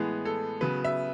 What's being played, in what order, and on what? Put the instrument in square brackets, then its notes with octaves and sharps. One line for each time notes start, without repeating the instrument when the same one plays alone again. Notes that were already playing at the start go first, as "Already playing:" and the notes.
Already playing: [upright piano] A2 E3 G#3 B3 G#4
A4
C#3 F#3 B3 B4
E5